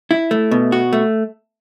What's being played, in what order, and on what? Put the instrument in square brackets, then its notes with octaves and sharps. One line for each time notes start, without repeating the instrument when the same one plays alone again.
[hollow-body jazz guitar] E4
A3
B2
F#4
A3